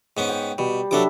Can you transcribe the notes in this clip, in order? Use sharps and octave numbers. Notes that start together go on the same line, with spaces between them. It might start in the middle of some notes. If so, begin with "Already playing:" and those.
G#2 B3 C#4
G5
B2 G3
F#3 G3 D4 A4 E5 D6